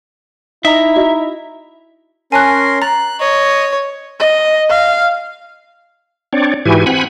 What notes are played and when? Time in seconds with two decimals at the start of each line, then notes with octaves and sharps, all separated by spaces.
0.65 D#4 E4 E5 A#5
0.96 F#4 D#5
2.32 C#4 A#4 G#5 A5 C6 F#6
2.82 A#5 F#6 A6
3.20 C#5 D#5
4.20 D#5
4.69 F5
6.33 C4 D4 C#5 D5
6.65 G#2 E3 E4 F#4 G4 G#5
6.86 C4 F#5 G#5 B5